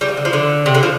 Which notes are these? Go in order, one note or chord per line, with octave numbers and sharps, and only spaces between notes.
G3
F3
D3
F3
D3
C3
D3
F3